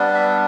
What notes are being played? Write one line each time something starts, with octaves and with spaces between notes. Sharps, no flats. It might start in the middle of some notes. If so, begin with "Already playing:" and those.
Already playing: G3 B3 D4
E5